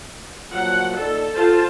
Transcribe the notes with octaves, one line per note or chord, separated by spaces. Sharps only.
A#2 F3 F#3 F#5
A#2 D#4 A4 D5
F4 F#4 A4 C5 A5